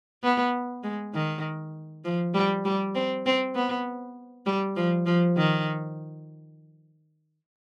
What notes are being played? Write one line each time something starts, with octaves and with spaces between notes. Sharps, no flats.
B3
G#3
D#3
F3
G3
G3
C4
C4
B3
G3
F3
F3
D#3